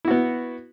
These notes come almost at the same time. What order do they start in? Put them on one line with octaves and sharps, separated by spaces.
E4 F#4 B3